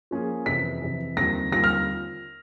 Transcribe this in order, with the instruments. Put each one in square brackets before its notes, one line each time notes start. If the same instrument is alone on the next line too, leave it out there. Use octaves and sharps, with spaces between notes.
[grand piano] F3 A#3 C#4 F4 G#4
[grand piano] F2 C3 E3 [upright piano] B6
[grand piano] F2 C3 E3
[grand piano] D#2 D3 G3 C4 F4 [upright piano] A#6
[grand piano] D#2 D3 G3 C4 F4 [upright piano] A#6
[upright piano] F6